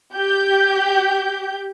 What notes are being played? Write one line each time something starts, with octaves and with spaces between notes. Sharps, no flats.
G4 G6